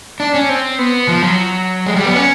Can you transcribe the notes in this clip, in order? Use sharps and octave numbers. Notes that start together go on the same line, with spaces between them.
D4
C#4
C4
B3
F3
F#3
G#3
G3
B3
C#4